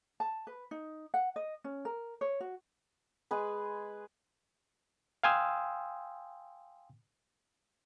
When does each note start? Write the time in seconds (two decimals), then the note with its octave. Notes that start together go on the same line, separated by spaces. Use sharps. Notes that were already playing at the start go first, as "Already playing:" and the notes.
0.20 A5
0.47 B4
0.71 D#4
1.14 F#5
1.36 D#5
1.64 C#4
1.85 A#4
2.21 C#5
2.40 F#4
3.31 G#3 G#4 B4
5.23 F5 G5 G#5 C6 D#6 E6